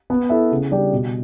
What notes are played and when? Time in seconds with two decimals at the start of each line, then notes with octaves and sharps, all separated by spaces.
0.10 B3
0.29 E4 A4 E5
0.51 C#3
0.71 G3 D4 G4
0.92 B2